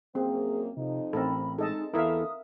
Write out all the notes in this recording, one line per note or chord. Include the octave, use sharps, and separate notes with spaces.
F#2 A#3 C4 G#4
F2 C3 D#4
A1 C4 A4 A#4 B5
G#3 D#4 A4 D#5 A5
E2 E3 E4 A4 A#4 E5 F5 D#6